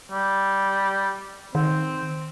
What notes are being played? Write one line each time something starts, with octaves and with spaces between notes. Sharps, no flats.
G3
D#3 C4